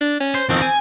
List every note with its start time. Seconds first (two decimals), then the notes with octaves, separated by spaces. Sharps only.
0.01 D4
0.20 C#4
0.35 C5
0.49 F2 D#3 C4
0.62 G#5